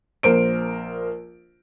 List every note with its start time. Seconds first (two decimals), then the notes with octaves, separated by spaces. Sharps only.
0.23 A#1 A#4 C5 D7